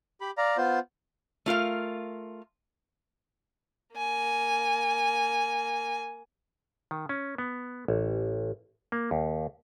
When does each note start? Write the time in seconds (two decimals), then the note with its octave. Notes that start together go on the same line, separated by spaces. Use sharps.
0.21 G4 B5
0.38 D5 F5 A#5
0.57 B3 F4 C5
1.46 A3 F4 A#4 F5
3.96 A#3 G#5
6.91 D#3
7.09 C#4
7.38 B3
7.88 A1
8.92 A#3
9.11 D#2